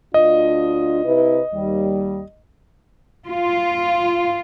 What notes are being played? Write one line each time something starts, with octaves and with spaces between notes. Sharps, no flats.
D2 D4 F4 D#5
C3 E4 B4
D#2 G3
F4